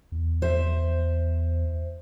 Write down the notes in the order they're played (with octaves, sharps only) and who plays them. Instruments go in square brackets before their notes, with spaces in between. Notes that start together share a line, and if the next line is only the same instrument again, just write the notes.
[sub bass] E2
[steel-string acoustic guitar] C5 E5